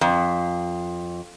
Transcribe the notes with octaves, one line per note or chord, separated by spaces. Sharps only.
F2